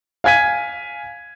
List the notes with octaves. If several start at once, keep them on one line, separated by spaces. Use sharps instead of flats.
F5 G#5 G#6 B6 D#7